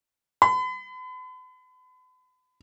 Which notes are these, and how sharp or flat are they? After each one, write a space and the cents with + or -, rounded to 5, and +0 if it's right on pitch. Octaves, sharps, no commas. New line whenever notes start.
B5 +40